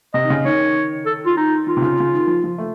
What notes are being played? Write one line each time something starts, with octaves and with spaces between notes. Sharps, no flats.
C3 D#5
D#3
C#3
D#3 C#5
A4
F4
D#4
D#3 F4
C3
C#3
C#3
D#3
F3
F3
A3